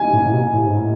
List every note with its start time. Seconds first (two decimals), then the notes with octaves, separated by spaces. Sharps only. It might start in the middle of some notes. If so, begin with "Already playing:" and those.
Already playing: G#5
0.13 A2
0.26 A2
0.33 B2
0.53 A2
0.66 G#2
0.78 A2